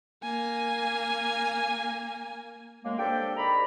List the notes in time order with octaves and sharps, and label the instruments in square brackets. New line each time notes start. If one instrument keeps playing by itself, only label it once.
[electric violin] A#3 G#5
[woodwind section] F#2 G#3 A#3
C4 D4 G4 A4 G5
G#2 D#3 G4 D5 A#5 B5